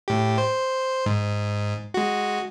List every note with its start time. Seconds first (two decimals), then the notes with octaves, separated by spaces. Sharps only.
0.08 A2 G4
0.38 C5
1.06 G#2
1.94 G#3 F#4